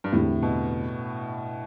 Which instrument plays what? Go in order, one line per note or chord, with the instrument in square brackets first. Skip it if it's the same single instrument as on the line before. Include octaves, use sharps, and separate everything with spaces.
[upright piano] G2
[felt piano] E2 D3 A3 C4 G4 [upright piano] A2
[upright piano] B2